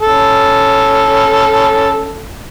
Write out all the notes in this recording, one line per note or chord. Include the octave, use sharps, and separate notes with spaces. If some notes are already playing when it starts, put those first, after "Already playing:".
C#4 A4